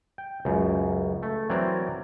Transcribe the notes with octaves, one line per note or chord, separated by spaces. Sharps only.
G5
C#2 F#2
A3
E3 F#3 C4 A#4 C5 D5